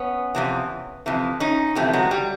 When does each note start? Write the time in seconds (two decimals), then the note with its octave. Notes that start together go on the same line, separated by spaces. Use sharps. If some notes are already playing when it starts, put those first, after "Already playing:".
Already playing: B3 C#4
0.35 F2 C3 E3
1.06 F2 C3 E3
1.40 C#4 D#4
1.75 F2 C3 E3 G3 A3
1.93 F#3 G#3
2.11 G3